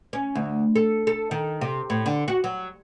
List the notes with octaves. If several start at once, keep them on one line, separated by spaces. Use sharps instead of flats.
C#4
D2
A4
A4
D#3
C3
A2
D3
F#4
F#3